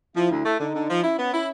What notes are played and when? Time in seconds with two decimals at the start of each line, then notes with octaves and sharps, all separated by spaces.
0.16 F3 E4
0.31 D2
0.45 A3
0.60 D3 D#4
0.75 D3
0.90 F3
1.04 C#4 E4
1.19 B3
1.34 E4